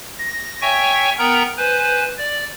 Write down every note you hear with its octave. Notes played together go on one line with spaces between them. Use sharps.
A#6
C#5 E5 G5 G#5 C#6
B3 A#4 G5 A#5
B4 C5 G#5
D5